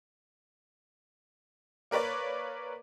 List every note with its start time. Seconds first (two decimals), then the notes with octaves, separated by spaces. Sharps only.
1.91 A#3 A#4 B4 C#5 D5